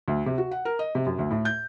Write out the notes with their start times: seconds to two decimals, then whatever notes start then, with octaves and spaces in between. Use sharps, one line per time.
0.08 D2
0.26 C3
0.38 F#4
0.51 F#5
0.65 A#4
0.79 D#5
0.95 C3
1.06 F#2
1.19 D2
1.31 A2
1.45 G6